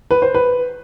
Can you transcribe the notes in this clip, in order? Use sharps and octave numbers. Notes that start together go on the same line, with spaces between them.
B4
C5
B4